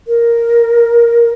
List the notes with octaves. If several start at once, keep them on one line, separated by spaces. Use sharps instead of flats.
A#4